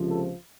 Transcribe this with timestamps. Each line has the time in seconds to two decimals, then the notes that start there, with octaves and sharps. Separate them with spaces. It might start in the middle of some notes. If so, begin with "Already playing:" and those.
Already playing: C#2 C3 F3
0.09 A4